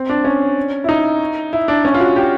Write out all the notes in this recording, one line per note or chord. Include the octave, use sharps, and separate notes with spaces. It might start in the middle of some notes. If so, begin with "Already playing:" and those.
Already playing: C4
D4
C#4
E4
D#4
E4
D4
C#4
F4
F#4
G4